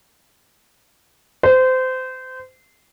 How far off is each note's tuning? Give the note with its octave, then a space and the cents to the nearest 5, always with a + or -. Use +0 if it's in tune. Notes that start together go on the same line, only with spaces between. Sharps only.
C5 -25